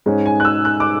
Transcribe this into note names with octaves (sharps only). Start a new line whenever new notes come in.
G#2 G#3 C#4
G#5
F#6
E6
F#6
D6